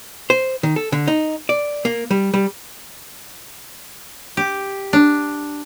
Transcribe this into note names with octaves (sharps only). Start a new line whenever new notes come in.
C5
D#3
A4
D3
D#4
D5
A#3
G3
G3
G4
D4